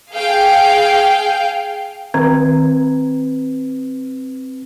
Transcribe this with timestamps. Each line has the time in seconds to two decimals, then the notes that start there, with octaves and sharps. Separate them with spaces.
0.12 G#4 F5 G5
2.14 D#3 C4 B4